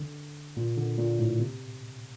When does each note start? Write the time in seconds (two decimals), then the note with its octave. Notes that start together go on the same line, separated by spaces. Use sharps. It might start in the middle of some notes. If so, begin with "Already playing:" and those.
Already playing: D3
0.57 A#2
0.77 D3
0.98 A#2
1.19 A2
1.40 C3